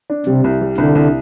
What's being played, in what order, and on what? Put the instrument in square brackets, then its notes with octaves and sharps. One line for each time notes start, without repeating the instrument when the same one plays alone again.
[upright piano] D4
[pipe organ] C3 [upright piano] G3
[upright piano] C2
G3
[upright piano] C2 [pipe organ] D3
[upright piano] C2